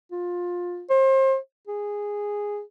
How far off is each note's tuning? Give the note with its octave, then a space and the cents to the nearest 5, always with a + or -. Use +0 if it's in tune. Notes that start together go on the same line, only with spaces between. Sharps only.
F4 +20
C5 +35
G#4 -10